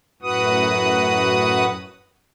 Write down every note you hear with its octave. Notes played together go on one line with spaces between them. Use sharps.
F#2 A2 F#4 B4 F#5 D#6